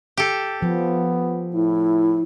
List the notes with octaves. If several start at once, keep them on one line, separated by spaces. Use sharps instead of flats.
G4 A4
F3 B3
A2 E4